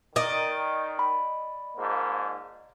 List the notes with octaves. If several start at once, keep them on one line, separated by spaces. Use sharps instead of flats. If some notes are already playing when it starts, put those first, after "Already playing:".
D#3 D5 D#5
B5
G#2 F3 A#3